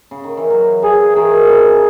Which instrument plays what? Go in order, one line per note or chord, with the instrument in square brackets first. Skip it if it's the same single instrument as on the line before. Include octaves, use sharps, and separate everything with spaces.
[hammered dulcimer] C#3
D#3
E3
F#3
[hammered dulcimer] E3 [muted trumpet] G#4
[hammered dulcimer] D#3 [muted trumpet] G#4
[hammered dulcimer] C#3